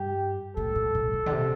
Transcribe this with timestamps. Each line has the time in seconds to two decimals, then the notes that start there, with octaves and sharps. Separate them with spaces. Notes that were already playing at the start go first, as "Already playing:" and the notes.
Already playing: G2 G4
0.56 A2 A4
0.75 A#2
0.95 A#2
1.13 A#2
1.26 D3
1.31 C3